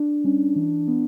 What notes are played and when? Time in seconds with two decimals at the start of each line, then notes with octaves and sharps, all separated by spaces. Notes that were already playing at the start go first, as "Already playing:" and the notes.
Already playing: D4
0.24 G3 C#4
0.56 E3
0.88 B3